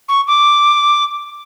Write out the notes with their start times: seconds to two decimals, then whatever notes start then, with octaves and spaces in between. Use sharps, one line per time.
0.09 C#6
0.27 D6